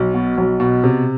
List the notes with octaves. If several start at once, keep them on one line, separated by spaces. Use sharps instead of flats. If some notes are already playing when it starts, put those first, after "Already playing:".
Already playing: B1
B2
B1
B2
C3